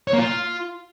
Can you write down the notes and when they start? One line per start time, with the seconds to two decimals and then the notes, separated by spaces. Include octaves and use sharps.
0.08 C#5
0.13 A#3
0.18 F4